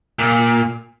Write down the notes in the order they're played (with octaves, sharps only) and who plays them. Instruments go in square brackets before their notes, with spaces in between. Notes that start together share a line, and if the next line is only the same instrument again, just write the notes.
[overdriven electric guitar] A#2